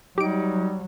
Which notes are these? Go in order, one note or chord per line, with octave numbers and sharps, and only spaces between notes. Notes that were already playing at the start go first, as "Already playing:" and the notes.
F#3 G3 D#4 G4 D7